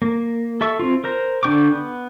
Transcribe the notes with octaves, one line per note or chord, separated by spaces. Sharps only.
A#3
A4 E5 C#6
C4 F4
A#4 C5 A#5
D3 D4 G5 C#6 D6
B3